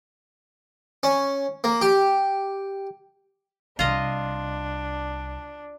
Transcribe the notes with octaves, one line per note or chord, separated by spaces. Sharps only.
C#4
A#3
G4
C2 D4 F4 D#5